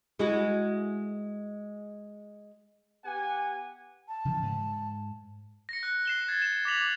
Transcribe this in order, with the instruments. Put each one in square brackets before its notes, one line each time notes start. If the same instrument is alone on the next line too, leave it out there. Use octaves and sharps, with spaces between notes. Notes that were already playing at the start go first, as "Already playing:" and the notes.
[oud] G#3 E4 F#4
[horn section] B3 G4 F#5 G#5
[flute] A5
[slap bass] C#3 E3 F3
G#2
[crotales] A#6 C#7
F#6
C7 E7 G7
G#6 A6
E7
D6 G#6 A#6 B6 F7 F#7